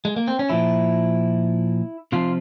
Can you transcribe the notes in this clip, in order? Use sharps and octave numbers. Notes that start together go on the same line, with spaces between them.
G#3
A#3
C4
C#4
A#2 F3 E4
C3 F3 F4